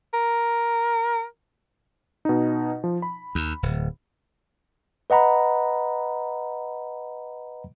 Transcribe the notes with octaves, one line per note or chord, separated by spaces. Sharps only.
A#4
B2 D#4
F3
B5
D#2
D1
B4 D#5 F#5 A#5 B5